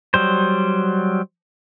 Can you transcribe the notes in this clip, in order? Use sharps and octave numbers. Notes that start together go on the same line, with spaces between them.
F#3 G3 C5